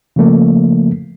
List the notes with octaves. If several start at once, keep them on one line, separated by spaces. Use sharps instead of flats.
C#3 F3 A3 A#3